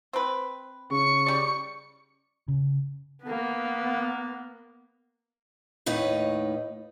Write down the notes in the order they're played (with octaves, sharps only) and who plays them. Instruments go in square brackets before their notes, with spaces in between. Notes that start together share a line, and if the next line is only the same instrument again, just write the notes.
[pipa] C4 B4
[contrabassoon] C#3 [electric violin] C#6 C#7
[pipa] G3 D5
[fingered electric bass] C#3
[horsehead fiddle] A#3 B3
[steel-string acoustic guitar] D#2 A2 D#4 B4